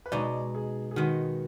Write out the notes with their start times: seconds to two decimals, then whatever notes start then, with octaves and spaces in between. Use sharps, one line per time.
0.06 B4
0.12 B2 G#3 D#4 D5
0.55 G#4
0.91 G#4
0.96 D#3 G#3 B3 F#4